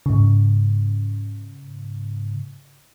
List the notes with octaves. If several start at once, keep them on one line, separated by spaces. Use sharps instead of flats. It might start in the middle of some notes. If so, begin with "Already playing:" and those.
G#2 C#3